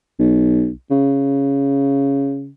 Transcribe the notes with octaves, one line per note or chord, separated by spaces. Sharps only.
B1
C#3